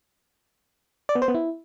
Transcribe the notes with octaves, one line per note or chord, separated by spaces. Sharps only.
D5
B3
C5
B3
E4